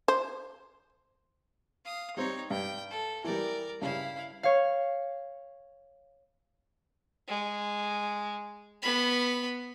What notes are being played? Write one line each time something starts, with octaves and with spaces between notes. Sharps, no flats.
C5
F5 D#6
G3 C4 D#4 C#5
G2 G5
A4
E3 G3 A#4 D5
G2 C#3 C#4 E4 F5
C#5 F5
G#3
B3 B5